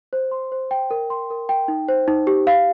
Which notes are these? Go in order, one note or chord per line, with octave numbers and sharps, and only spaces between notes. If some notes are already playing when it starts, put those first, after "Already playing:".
C5
C6
C5
G5
A#4
C6
A#4
G5
D#4
C5
D#4
G4
F5